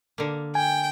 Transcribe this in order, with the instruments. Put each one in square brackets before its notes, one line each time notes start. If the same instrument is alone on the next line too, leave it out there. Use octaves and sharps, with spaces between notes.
[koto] D3 A#3
[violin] G5 [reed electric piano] G#5